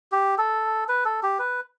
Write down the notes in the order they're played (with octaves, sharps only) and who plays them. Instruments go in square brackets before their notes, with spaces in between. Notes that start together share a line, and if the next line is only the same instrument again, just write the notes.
[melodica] G4
A4
B4
A4
G4
B4